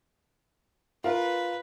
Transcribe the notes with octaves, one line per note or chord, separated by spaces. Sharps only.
F4 A#4 B4 F5